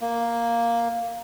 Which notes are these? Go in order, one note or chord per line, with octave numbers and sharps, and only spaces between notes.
A#3